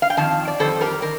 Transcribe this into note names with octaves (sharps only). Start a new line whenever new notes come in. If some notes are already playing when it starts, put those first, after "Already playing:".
F5
G5
F2 D#3 F5 A5
D5
F2 D#3 G3 A4 C5
G4 A#4
D#3 A#4